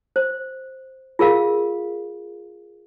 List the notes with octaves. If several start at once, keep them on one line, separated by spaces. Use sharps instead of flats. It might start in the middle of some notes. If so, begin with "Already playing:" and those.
C5
F4 G#4 A#4 F5